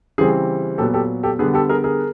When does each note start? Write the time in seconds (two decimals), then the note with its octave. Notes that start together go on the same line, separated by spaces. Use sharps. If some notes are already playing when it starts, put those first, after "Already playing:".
0.18 C#3 E3 G3 C4 G#4
0.78 A#2 F#3 B3 G4 A4
0.94 G4 A4
1.23 G4 A4
1.39 D3 G3 B3 G#4
1.54 G4 A4
1.69 G#4 A#4
1.84 G#4 A#4